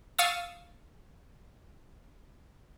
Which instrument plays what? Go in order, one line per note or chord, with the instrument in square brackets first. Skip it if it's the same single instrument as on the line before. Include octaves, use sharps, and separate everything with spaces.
[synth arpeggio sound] F5 C#6 D#6 E6 A6